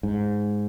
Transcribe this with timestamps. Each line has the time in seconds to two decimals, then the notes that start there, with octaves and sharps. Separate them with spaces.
0.03 G#2